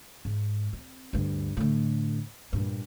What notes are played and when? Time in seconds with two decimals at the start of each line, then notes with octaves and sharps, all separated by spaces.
0.25 G#2
0.73 C4
1.13 D2 G2
1.57 A2 D3
2.53 G2 A#2